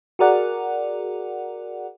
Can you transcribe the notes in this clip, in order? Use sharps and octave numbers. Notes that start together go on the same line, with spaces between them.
F#4 G#4 A#4 D5 F#5